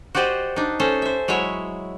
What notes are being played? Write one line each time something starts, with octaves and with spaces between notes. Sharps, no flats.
F#4 G4 C5 D5 D#5
D4 D#4
C#4 A4 C5
C5 E5
F#3 G#3 E4 C#5 E5